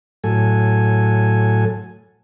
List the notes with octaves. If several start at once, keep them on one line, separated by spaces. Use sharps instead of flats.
A2 F#3 A4 G#5